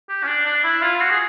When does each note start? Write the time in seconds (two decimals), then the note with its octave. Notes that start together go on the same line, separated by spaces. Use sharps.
0.09 G4
0.23 C#4
0.27 D4
0.46 D4
0.64 E4
0.82 F4
1.00 F#4
1.10 G#4